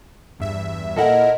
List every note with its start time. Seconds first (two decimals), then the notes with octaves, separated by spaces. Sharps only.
0.39 E2 G2 E5
0.96 A#2 E4 A4 A#4 D#5 F#5